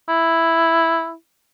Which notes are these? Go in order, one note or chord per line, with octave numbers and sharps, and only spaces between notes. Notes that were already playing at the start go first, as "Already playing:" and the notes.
E4